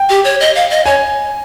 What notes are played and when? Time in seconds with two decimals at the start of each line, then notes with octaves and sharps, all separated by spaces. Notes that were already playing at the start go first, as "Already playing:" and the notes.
Already playing: G5
0.09 G4
0.25 C#5
0.40 D#5
0.55 F5
0.70 D#5
0.86 C#5 G#5